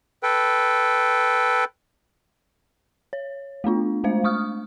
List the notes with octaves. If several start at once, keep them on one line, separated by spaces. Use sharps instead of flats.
A4 B4 G5
C#5
A3 B3 D4 F4
G#3 A3 D4 C5 F5
A3 C#6 D#6 F6